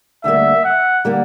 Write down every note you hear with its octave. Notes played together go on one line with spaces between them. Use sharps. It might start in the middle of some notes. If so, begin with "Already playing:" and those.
D2 D3 G3 A#3 E5
F#5
D3 G3 A#3